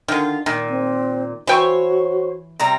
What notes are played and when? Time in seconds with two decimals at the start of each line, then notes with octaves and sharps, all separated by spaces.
0.08 D3 D#3 F4
0.46 A#2 D#3
0.69 C4
1.47 E3 F#4 C5 C#5 G5 C#6
2.60 C3 G3 A#5